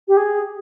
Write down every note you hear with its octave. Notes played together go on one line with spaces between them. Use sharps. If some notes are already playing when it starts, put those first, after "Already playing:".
G4
G#4